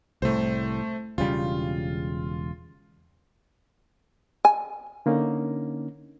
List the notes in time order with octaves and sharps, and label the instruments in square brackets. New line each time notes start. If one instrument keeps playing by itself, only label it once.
[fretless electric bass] C2 A2 [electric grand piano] A3 C5
[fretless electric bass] E1 C#3 G3 [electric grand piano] F4
[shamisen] G#5
[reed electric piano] D3 A#3 C#4 D#4